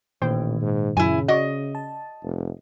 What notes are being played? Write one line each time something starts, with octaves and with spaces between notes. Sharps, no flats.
A1 A#2 D#3 C5 G5
G#2
F#2 C#3 E4 G#5
F#4 D5 D#5 C#6
A5
F1